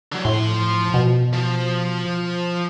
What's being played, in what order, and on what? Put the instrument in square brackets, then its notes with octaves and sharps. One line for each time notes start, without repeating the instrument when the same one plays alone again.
[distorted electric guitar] D3 F#3
[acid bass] A2 [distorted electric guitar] F3 C6
[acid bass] B2
[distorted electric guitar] F3